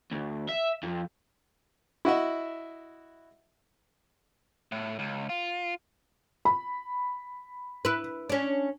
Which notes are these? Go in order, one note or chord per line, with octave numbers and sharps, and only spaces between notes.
D2
E5
F2
E4 F#4 D#5 E5
A2
C#2
F4
B5
E4 B4
C#4 D4